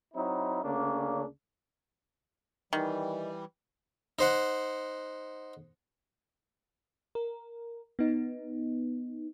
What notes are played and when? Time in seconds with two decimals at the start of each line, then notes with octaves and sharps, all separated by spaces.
0.15 F#3 C4 D#4 E4
0.63 D2 C#3 A#3 C#4 D4
2.73 D#3 E3 G3
4.19 D#4 C5 F#5
7.15 A#4
7.99 B3 D#4